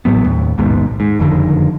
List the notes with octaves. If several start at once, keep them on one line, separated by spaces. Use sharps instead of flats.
A1 A2 F#3 B3
D#2 A2
A#1 D#2 G#2 B2
G#2
F#1 F2 D3 D#3